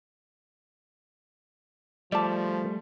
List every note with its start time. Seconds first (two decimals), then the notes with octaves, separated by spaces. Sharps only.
2.12 F3 G3 A3 D5 A5